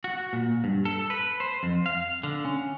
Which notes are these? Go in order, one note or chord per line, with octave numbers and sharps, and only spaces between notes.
F#4
A#2
G2
A4
B4
C5
F2
F5
D3
C#4